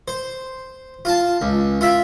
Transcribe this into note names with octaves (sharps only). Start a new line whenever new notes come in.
C5
F4 A5
C#2
F4 E5